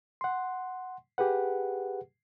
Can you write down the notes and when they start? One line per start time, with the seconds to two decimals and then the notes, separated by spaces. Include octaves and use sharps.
0.21 F#5 C6
1.18 G4 G#4 B4 F#5